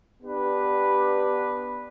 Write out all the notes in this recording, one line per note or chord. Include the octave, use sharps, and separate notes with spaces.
B3 D4 G4 B4